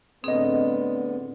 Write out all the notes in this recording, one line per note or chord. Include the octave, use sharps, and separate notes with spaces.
A2 D3 B3 C4 G#4 D#5 D#6